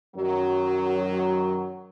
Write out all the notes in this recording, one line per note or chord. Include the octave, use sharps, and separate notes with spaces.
F#2 D#3 F#3